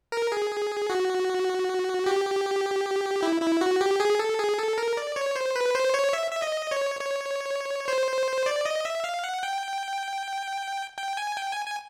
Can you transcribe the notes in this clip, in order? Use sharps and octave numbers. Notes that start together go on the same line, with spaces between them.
A#4
G#4
F#4
G4
E4
E4
F#4
G4
G#4
A4
G#4
A4
A#4
D5
C#5
C5
B4
C5
C#5
E5
E5
D#5
C#5
C#5
C5
D5
D#5
E5
F5
F#5
G5
G5
G#5
G5
G#5
G#5